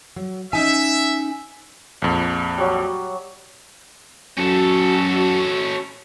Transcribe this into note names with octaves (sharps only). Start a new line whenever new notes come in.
F#3
C#4 D#4 E5 G#5
A#1 F2
F#3 G3
F#2 C#4 F#4 A4